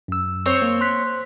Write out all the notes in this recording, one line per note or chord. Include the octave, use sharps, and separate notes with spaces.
F#2 E6
C4 C5 C#5
A#3
C6 F#6 B6